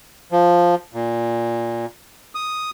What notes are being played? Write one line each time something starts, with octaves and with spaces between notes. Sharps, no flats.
F3
A#2
D#6